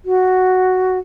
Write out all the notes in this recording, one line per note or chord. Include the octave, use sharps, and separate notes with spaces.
F#4